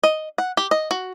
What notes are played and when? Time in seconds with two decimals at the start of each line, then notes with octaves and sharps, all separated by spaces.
0.03 D#5
0.38 F#5
0.57 G4
0.71 D#5
0.91 F#4